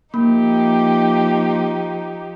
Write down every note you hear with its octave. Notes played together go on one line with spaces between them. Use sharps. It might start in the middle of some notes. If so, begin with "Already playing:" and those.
F3 A#3 D#4 G4